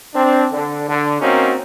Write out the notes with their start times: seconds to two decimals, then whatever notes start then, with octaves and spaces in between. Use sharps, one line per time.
0.15 C4 D4
0.52 D3
0.89 D3
1.21 A#3 C4 C#4 D#4 F#4